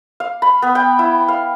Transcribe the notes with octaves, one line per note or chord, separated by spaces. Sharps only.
F5
B5
B3
G5
E4
F5